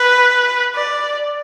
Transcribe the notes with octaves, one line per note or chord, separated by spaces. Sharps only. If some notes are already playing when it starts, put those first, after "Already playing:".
Already playing: B4
D5